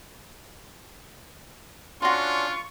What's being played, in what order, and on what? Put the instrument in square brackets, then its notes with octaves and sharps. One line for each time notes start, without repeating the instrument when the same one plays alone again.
[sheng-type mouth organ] C#4 D4 [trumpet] F4 [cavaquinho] F#4 F#5 C6 [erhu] C#6